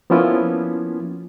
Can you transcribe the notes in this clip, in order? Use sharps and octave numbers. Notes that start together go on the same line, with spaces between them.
F3 A#3 B3 C#4 E4 F4